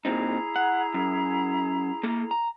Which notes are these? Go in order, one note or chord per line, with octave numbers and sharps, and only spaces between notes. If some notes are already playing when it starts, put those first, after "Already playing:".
A#2 C4 D#4 E4 G#4 A#5
F#5
F#2
A#3 A4
A#5